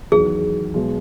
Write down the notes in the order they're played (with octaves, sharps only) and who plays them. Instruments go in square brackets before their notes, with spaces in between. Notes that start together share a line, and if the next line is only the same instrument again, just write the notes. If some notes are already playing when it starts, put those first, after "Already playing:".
[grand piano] E2 D#3 F#3 [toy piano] G#4
[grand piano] B1 B2 G#3